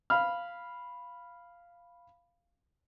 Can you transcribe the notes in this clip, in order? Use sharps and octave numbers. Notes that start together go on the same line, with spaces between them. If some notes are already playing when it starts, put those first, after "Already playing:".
F5 B5 F6